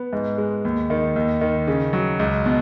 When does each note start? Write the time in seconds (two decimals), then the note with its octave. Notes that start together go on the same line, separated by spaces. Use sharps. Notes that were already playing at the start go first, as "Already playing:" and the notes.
Already playing: B3
0.13 G#2
0.38 G#3
0.65 D#2
0.90 D#3
1.16 D#2
1.41 D#3
1.67 C#3
1.93 F#3
2.19 C#2
2.46 B2